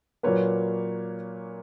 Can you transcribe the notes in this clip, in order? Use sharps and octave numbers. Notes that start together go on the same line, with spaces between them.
A#2 F#3 A#3 B4 C#5